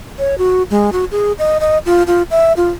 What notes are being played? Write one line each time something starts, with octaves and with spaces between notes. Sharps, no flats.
C#5
F#4
G#3
F#4
G#4
D#5
D#5
F4
F4
E5
F4